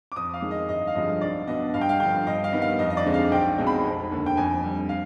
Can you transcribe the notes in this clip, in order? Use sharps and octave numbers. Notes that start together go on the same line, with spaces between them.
D6
F2 D#6
F5
D#3 G#3
D#5
G1 D#5
F5
G2 D3 F3 G#3 D#5
B1 D5
B2 B3 D4 D#5
G2 F5
G5
F5
D3 F3 G5
G2 D#5
F5
D#3 G3 B3
F5
F2 D#5
D#5
D5
D3 G#3 C4 D#4
F5
B1 G5
B2 G#3 C4 D#4
B5
F1
D#2 D3
G5
F2 G#5
D3 G3
F5